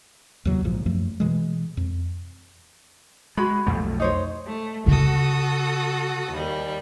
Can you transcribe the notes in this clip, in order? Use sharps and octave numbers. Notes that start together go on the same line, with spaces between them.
D#2 A2 C#3 F#3
A#1 G#2 F3
F#2 F3 A3
B2 E3 G#3
F2
G#3 F#4 B5
B1 F2 A3
D#4 C5 C#5
A3
C#3 B3 F#4 A4 D#6
D#2 G3